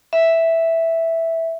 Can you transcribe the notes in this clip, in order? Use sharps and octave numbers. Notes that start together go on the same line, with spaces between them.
E5